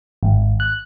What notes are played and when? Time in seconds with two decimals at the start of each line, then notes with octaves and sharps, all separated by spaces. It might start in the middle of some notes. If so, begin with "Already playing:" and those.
0.23 G#1
0.60 F#6